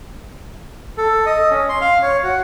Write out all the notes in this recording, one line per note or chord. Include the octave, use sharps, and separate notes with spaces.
A4
D#5
C#4
C6
F5
C#5
F#4